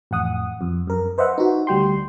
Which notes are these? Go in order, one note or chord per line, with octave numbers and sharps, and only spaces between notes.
A1 F2 F#5 D#6
F2
F#2 A#4
B4 C5 D#5 E5 F#5
D#4 F#4
D2 G3 G5 C6